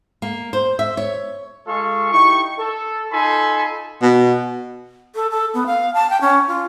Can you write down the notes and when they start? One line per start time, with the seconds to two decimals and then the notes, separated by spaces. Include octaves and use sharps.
0.22 A#3
0.53 C5
0.79 E5
0.97 C#5
1.67 G#3 F4 G#4 A4 F5 C#6
2.13 D#4 E4 G4 C#6
2.59 A4
3.12 D#4 F4 A4 G#5 B5 C6
4.02 B2
5.15 A4
5.31 A4
5.54 B3
5.66 F5
5.94 A5
6.10 G5
6.21 C#4
6.48 F4